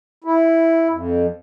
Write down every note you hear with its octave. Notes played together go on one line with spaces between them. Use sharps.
E4
F2